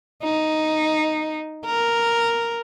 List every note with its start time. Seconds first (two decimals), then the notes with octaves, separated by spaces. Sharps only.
0.23 D#4
1.65 A#4